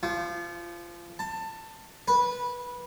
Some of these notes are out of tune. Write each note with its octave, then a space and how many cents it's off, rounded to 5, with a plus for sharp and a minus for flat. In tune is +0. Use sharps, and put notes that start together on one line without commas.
F3 -20
A5 +20
B4 -15